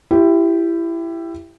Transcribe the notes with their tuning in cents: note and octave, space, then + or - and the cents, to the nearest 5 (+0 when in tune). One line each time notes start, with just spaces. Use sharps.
E4 +20 G4 +0